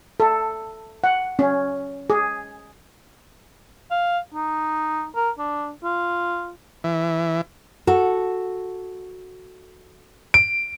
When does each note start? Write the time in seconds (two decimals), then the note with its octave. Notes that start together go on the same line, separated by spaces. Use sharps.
0.20 A4
1.04 F#5
1.39 C#4
2.10 G#4
3.91 F5
4.35 D#4
5.16 A#4
5.39 D4
5.84 F4
6.84 E3
7.87 F#4 A4
10.34 D7